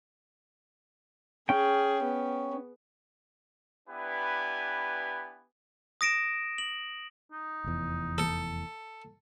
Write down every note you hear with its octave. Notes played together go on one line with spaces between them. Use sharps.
C#4 G#4 G5
B3
B3 D4 E4 G4 B4 G#5
D#6 A#6 D7 E7
F#7
D#4
F1 E2
A4